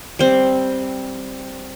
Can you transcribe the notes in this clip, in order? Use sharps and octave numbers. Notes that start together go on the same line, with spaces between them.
G3 C4